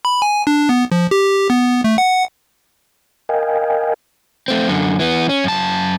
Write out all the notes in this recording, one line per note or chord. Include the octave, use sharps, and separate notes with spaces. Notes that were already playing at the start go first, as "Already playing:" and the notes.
B5
G#5
D4
B3
F3
G4
B3
A3
F#5
A#4 D#5 F5 G5 G#5
A3 C4
F#2 D3
E3 B3
C#4
F#2 A5